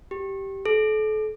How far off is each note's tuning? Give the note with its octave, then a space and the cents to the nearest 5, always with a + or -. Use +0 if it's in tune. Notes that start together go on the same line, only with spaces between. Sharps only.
G4 -10
A4 -35